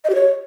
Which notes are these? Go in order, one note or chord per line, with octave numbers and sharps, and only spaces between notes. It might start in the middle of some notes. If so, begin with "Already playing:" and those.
D#5
G4
C#5